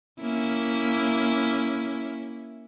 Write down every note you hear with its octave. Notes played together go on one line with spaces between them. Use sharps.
A#3 C#4 E4